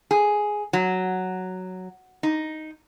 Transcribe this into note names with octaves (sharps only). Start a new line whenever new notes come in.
G#4
F#3
D#4